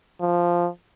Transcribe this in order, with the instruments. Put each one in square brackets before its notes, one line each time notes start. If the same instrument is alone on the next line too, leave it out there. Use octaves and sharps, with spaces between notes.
[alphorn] F3